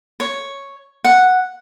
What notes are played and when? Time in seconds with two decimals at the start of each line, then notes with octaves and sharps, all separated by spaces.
0.20 C#5
1.04 F#5